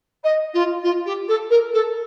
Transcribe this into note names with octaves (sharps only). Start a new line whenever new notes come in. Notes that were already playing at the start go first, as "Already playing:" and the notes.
D#5
F4
F4
G4
A4
A#4
A4